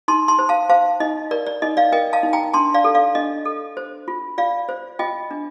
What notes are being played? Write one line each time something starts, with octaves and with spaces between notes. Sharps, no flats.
D#4 A5 C6
A5 C6
C5
F5 A5
C5 F5 A5
D#4 D#5
A#4 D5
D5
D#4 D#5
D5 F5
A#4 D#5 G5
F5 A5
D#4
G5 A#5
D4 A5 C6
D5 F5
A4
D5 F5
D4 D#5
A4
C5
F4
F4 D5 F5
C5
F4 D#5 G5
D4